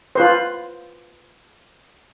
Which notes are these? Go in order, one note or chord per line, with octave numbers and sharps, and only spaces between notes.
F4 B4 C5